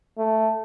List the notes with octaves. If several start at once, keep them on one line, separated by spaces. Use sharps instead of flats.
A3